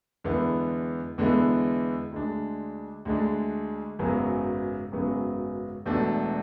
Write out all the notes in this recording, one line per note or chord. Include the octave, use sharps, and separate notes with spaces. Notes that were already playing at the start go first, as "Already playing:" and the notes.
E2 D3 G#3 B3 E4
E2 D3 G#3 B3 E4
D2 D3 G#3 D4
D2 D3 G#3 D4
G#1 F#2 C#3 F#3 B3
G#1 F#2 C#3 F#3 B3
E1 E2 B2 A3 D4